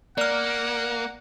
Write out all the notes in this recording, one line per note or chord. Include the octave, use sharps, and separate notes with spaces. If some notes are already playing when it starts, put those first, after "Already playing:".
A#3 D5 F#5 F6